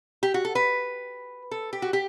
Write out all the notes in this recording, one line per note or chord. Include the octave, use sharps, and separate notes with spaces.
G4
F#4
A4
B4
A4
G4
F#4
G4